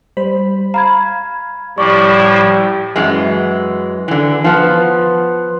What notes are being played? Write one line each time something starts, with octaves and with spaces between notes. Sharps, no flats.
G3 C5 B5
F5 A#5 B5 G#6
A2 F3 G3 E4 D5 C#6 D6
F#2 E3 G#3
D3 E3
F3 B3